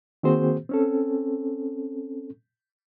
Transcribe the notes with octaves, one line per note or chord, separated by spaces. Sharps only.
D#3 A#3 C4 F#4 G#4 C5
C4 C#4 A4